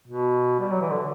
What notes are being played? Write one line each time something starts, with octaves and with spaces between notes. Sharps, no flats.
B2
G3
F#3
E3
D3